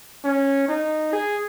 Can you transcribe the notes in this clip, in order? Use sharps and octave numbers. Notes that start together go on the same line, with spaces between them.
C#4
D#4
G#4